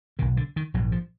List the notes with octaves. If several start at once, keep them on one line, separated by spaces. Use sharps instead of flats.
B1 B2 D#3
D3
D#3
A#1 G#2 F#3
F3